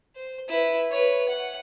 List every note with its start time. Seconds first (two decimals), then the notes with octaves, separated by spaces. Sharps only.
0.15 C5
0.49 E4 B4
0.91 B4 C#5
1.28 F#5